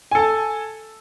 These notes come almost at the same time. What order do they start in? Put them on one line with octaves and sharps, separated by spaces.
G#5 A4 A5